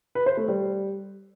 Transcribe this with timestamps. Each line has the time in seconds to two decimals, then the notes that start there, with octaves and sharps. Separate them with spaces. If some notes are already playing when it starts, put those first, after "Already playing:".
0.15 B4
0.26 C5
0.37 A3
0.48 G3